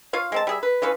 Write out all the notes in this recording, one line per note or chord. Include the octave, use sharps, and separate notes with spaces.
F4 C#5 F5
G#3 C4 A5
G3 G#4 E5
B4
E3 F3 C#4 B4